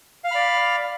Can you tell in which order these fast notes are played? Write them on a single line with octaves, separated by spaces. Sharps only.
F5 F6 B5 D5